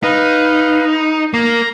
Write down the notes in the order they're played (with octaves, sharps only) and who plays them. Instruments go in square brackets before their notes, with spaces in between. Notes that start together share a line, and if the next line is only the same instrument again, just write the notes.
[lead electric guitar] D#4 [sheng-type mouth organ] B4 F5
[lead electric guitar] A#3 [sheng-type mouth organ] A#5